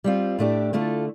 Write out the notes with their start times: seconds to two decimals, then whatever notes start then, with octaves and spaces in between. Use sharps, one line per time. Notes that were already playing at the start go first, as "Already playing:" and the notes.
0.04 G3 C4 F4
0.39 A2 A3 D4 G4
0.73 D3 A3 F4 A4